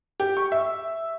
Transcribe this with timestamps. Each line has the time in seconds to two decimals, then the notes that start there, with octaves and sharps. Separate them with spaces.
0.20 G4
0.37 C#6
0.52 E5